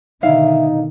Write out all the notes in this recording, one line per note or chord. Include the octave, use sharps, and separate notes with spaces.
B2 D3 D#3 D#4 E5 F5